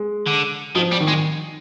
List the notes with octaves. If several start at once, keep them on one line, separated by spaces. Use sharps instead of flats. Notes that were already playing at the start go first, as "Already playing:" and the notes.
Already playing: G#3
D3
D#3 F3
G3
D#3
G#3
D#3